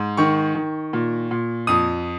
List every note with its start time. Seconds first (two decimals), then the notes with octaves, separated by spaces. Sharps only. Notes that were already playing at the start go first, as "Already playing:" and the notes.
Already playing: G#2
0.17 D#3 C#6
0.55 D#3
0.93 A#2
1.31 A#2
1.67 F2 D#6